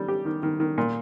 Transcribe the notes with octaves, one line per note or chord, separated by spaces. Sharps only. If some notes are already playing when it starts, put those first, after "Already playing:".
Already playing: D#3 G3
G4
D#3
D#3
D#3
A#2